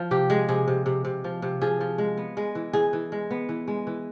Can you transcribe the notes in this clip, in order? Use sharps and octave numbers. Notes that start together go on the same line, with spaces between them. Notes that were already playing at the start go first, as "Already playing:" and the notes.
Already playing: F3
C3 G4
G#3 G#4
C3 G#4
C3
C3
C3
F3
C3
F3 G#4
F3
G#3
B3
G#3
E3
E3 G#4
E3
G#3
B3
E3
G#3
E3